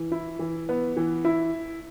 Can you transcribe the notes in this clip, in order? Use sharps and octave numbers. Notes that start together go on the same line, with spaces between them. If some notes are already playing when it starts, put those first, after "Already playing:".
Already playing: E3
E4
E3
B3
E3
E4